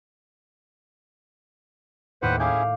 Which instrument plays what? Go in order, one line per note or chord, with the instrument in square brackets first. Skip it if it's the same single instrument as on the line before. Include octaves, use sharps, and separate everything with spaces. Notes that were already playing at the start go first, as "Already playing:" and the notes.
[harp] D#2 A2 [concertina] B4 C5 F#5
[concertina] C#4 E4 G#4 [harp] F5 D6 G6